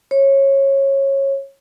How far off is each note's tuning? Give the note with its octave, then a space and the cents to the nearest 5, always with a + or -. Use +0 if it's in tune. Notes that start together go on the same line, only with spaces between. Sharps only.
C#5 -20